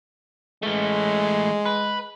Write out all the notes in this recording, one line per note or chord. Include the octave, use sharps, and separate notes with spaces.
E3 G#3 A3
B4